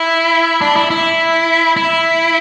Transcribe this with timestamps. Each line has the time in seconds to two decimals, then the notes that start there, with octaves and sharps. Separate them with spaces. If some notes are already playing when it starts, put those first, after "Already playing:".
Already playing: E4
0.61 D4
0.76 E4
0.91 E4
1.77 E4